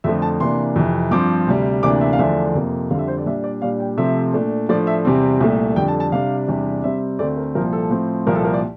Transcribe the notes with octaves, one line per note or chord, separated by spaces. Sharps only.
F2 D3 F3 A3 E5
A5
C3 E3 A#3 D4 C6
F2 C3 E3
G2 F3 C4 D6
D2 C3 G3
D2 C3 E3 A#3 D4 D6
E5
F5
E2 D3 F3 A3 D4 E5
F2 C3 F3 A#3
F2 D3 G3 C4 F5
E5
C5
D5
A#2 G3 D4 E5
D5
A#2 G3 D4 F5
G5
C3 F3 A3 C4 E5
A#2 A3 D4
A2 F3 A3 D4 D5
E5
E2 C3 G3 C4
C2 A#2 A3
F2 D3 G3 G5
A5
A5
C3 G3 D4 F5
E2 C3 G3 D4
C3 G3 C4 E5
D2 D3 A3 C4 D5
A#4
C2 A#2 F3 A#4
A4
A2 F3 C4
C2 A#2 F3 A#3 A#4
A4
A#4
D5